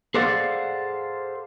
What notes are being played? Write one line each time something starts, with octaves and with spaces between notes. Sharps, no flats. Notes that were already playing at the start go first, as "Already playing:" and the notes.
G#4 A4 C5 D5 F5 F#5